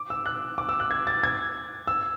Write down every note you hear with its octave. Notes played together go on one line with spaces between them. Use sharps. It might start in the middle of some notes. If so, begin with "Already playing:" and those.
Already playing: D6
E6
F#6
D6
E6
F#6
G#6
A6
G#6
E6